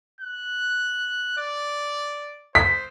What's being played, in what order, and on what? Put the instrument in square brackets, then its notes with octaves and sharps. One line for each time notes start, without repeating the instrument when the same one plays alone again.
[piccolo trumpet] F#6
D5
[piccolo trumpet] C5 [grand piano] B6